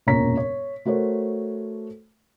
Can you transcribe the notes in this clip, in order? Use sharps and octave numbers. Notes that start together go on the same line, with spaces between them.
E1 F#2 A#2 C#5 A#5 B6
C#5
A3 F#4 A#4 C5 C#5